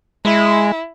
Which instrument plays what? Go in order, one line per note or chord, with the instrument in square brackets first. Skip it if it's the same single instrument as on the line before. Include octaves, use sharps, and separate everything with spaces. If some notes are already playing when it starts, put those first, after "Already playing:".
[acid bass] G#3 [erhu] E4